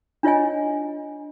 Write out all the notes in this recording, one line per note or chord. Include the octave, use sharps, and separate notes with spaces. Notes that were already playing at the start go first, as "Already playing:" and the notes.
D4 F4 C#5 D#5 G#5